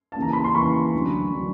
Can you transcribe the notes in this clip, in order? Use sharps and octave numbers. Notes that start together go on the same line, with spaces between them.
D#2 C#3 E3 A5
A#5
B5
C6
D#2 C#3 E3 B5 C#6
D2 D3 F#3
D3 F#3